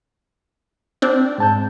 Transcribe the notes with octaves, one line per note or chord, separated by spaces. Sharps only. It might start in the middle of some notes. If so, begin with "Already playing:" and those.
C4 D4
G#2 A5 G6